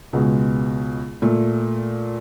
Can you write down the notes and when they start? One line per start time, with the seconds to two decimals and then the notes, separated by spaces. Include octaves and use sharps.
0.13 C#2 B2 G#3
1.22 A#2 A3